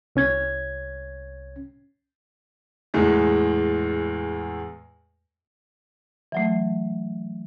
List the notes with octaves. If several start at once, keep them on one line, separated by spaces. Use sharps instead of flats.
C2 C#4 G#6
E2 A2 G#3 A3
E3 F#3 A3